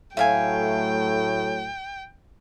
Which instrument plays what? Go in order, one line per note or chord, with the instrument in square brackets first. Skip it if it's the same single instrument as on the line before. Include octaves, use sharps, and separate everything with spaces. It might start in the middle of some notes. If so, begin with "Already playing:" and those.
[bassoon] A2 [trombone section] F#3 A3 [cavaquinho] E5 F5 G#5 [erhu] G5